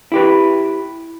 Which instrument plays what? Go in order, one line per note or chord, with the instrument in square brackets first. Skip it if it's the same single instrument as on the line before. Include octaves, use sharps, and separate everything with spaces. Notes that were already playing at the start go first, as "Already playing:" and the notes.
[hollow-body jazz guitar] E4 G4 B4